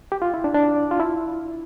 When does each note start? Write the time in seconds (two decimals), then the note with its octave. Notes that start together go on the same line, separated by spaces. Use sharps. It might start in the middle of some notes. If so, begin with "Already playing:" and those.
0.12 G4
0.22 F4
0.34 E4
0.44 D4
0.54 D4
0.91 F4
1.00 E4